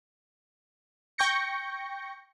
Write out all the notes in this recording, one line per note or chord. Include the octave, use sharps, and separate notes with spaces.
G5 C#6 G6 A#6 C#7